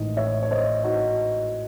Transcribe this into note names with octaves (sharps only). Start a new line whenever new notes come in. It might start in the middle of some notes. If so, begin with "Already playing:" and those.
Already playing: A1 G#2 D#3 D#5
C#5 E5
C#5
C5 D#5
D#4 F#4